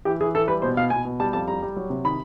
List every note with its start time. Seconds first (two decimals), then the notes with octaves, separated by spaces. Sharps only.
0.05 E3 G4
0.21 E3 G#4
0.35 E3 A4
0.48 G3 B4
0.62 B2 C5
0.77 B2 F5
0.90 B2 G#5
1.05 B2
1.20 G3 A5
1.33 F2 A5
1.48 G3 A#5
1.62 G3
1.76 F#3
1.90 C3
2.05 D#3 B5